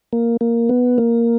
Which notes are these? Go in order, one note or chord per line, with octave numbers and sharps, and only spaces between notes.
A#3
A#3
B3
A#3